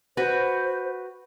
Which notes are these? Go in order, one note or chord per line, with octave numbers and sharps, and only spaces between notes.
F#4 B4 C5